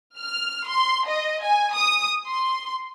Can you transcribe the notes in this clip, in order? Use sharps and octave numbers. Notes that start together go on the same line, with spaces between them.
F6
C6
D#5
G#5
D#6
C6